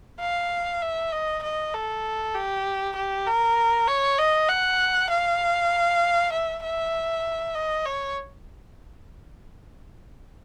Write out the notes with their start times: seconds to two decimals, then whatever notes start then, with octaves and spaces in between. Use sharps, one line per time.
0.21 F5
0.82 E5
1.12 D#5
1.43 D#5
1.74 A4
2.35 G4
2.96 G4
3.27 A#4
3.88 C#5
4.19 D#5
4.49 F#5
5.10 F5
6.33 E5
6.64 E5
7.55 D#5
7.86 C#5